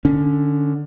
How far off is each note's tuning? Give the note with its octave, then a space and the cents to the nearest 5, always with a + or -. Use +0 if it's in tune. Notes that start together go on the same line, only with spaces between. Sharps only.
D3 +15 C#4 +30